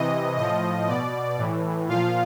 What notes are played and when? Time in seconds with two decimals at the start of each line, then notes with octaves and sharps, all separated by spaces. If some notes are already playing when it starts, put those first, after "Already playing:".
Already playing: C3 E3 D#5
0.37 A2 F3 D#5
0.87 B2 D5
1.37 A2 E3
1.88 A#2 F3 F4 F5